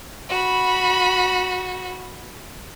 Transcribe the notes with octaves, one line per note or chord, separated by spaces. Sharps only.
F#4 B5